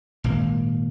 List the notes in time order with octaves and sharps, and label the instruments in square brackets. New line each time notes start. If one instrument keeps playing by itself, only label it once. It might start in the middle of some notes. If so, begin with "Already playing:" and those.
[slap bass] G#1 A#2 A#3